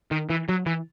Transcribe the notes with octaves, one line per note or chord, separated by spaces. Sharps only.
D#3
E3
F#3
E3